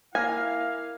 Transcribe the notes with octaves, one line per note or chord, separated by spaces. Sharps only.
A#3 E4 F5 G#5 F6 A#6